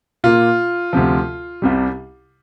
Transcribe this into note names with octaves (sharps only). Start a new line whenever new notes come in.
A#2 A#3 F4
D2 C3 F3
C2 C3 G3